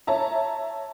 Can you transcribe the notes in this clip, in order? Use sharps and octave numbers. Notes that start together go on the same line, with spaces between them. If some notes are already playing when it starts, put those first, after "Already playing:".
C#5 E5 A5 A#5